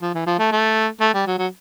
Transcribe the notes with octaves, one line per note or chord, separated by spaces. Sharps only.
F3
E3
F3
A3
A3
A3
G3
F#3
F#3